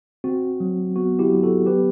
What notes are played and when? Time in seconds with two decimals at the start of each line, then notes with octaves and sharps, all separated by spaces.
0.24 C4 F#4
0.60 F#3
0.96 B3 F#4
1.19 E4 G4
1.32 F#3
1.43 F#4 A4
1.66 B3 G4 B4